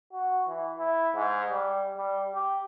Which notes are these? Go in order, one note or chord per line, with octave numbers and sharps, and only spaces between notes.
F#4
E3
E4
G#2
G3
G3
G4